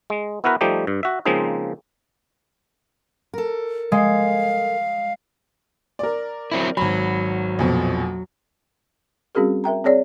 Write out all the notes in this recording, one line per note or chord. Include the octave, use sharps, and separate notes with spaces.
G#3
B3 E4 F#4 A#4 B4
F3 G3 A3 D#4 G4
G2
F#4 E5
C#3 F3 G#3 A#3 C4 D#4
A4 A#4
G#3 F5
A#4 D5
F#3 C4 E4
G#1 F#3 B5
A#1 F2 B2
G3 C4 C#4 F#4 G#4 A#4
A#4 E5 G5 A#5
C4 G#4 C#5 D5